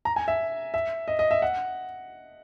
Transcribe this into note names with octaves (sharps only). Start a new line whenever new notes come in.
A#5
G#5
E5
E5
D#5
D#5
E5
F#5